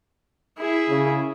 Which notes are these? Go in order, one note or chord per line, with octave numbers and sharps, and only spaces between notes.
E4 G#4
C#3